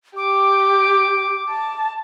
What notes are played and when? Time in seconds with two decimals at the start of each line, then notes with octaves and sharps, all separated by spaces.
0.16 G4 D6
1.50 A5